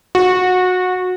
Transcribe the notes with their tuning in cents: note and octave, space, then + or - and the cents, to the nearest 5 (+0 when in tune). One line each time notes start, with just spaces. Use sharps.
F#4 -20